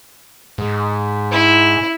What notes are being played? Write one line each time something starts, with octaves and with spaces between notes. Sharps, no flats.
G#2
E4